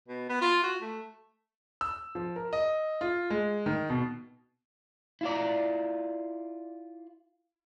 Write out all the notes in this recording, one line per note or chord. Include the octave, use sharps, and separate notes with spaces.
B2
B3
F4
F#4
A3
E6
F3
A#4
D#5
F4
G#3
D#3
B2
E4 F4 D5